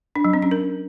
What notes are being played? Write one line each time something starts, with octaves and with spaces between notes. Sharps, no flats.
D4
F#3
C4
C#4
A#4